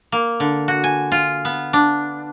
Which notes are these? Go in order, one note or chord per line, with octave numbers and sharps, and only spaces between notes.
A#3
D3
F#4
G#5
F4
B3
D4